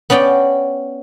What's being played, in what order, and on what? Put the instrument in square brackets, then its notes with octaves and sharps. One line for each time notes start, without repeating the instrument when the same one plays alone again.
[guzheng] B3 C#4 D5 G5